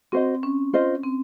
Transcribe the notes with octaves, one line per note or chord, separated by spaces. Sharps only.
C4 F#4 C5 D#5
C#4
F4 C5 D#5
C4